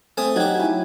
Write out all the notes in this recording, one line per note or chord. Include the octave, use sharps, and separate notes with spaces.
A3 C4 G#5 D#6
F#3 D#4 F#4 G4 G#6
E4 G#5